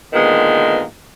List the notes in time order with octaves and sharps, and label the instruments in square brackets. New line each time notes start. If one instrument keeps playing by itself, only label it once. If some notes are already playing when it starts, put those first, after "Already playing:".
[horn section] A#2 D3 D#3 G#3 B3